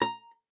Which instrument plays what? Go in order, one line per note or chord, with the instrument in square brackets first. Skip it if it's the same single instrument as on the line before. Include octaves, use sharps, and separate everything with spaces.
[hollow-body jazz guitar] A#5